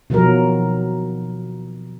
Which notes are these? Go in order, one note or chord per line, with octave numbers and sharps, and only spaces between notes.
B2 D#3 F3 F#3 A#4